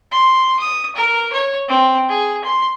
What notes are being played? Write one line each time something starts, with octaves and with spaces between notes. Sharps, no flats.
C6
D#6
A#4
C#5
C4
G#4
C6